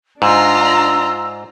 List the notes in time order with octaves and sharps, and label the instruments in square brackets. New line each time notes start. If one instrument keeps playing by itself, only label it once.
[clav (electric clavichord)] G#2 [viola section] D4 A#5 [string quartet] F4 [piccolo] E6